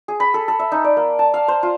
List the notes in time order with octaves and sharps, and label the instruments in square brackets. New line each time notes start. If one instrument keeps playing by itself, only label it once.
[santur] G#4
B5
A4
A4
E5
D#4
D5
A#3
A5
F5
C5
F4